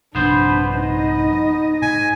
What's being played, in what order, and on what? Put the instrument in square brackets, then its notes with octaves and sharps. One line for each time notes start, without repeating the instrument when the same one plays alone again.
[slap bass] A#1 G2 C3 [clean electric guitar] B3 C5 [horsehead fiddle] D4 B4
[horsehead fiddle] D#4 D#5
[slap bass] G#2 [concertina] G#5